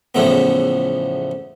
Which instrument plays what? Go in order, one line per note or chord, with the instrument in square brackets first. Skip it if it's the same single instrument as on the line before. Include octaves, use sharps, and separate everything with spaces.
[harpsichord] E2 A2 C#3 F3 A3 B3